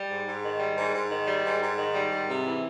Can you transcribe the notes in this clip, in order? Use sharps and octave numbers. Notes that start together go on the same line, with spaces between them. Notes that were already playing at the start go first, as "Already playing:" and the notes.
Already playing: G3
G#2
G#2
D#3
G3
G#2
G#2
D#3
G3
G#2
G#2
D#3
G3
G#2
C3
E3